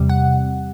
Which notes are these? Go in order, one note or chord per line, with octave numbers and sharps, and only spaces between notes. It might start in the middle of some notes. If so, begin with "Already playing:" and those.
Already playing: E2 C3 G3
F#5